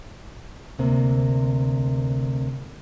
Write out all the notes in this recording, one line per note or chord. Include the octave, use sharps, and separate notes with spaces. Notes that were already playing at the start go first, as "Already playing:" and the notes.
D2 C3 A#3